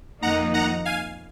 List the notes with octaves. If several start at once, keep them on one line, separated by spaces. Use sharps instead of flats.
F2 D#3 A#3 D#4 F#5 A#5
F#5 A#5
F5 G#5